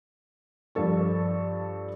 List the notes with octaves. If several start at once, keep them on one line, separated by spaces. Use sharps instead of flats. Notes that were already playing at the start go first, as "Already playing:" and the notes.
G2 F3 A4 C#6